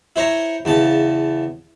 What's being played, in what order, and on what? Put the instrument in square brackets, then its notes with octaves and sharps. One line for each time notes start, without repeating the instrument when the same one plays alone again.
[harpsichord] E4 C5 C#5 A#5
E2 C#3 A5